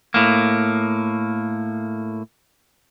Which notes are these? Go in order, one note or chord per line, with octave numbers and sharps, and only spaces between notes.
A2 A#3